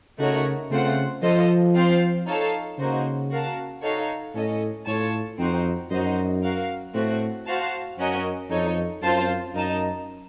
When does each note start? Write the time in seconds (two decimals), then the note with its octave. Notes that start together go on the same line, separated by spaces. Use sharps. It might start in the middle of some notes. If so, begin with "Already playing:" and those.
0.19 C#3 A3 D#4 F#4 A#4 C#5
0.70 C#3 A3 C4 F4 C5 F#5
1.23 F3 F4 A4 C5 D#5
1.75 C4 F4 C5 F5
2.27 D#4 A4 C#5 F5 A5
2.78 C#3 A#3 D#4 F#4 C5
3.30 F#4 A#4 F5 A5
3.82 D#4 F#4 A4 C#5 F5
4.34 A2 C#4 A4 D#5
4.87 A2 F4 A4 C#5 A5
5.39 F2 C4 D#4 F#4 C5
5.91 F#2 D#4 F#4 C5 D#5
6.43 F#4 A#4 F5
6.94 A2 A3 C4 F#4
7.47 F#4 C5 F5 A5
7.98 F#2 C#4 F#4 A#4 D#5
8.50 F2 D#4 A4 C#5
9.02 F#2 C4 F4 C5 F5 A5
9.55 F#2 D#4 A#4 D#5 A5